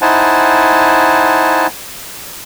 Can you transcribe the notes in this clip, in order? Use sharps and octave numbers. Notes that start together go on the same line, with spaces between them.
D#4 E4 C5 F#5 G#5 A5